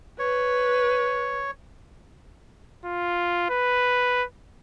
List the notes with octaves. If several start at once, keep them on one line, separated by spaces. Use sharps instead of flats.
B4 C#5
F4
B4